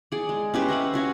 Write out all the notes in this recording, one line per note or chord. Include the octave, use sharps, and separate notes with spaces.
G#4 D5
G#3
C#4 G4 B4 C5
D#5 E5 F#5 B5
C#4 F#4 C#5 F5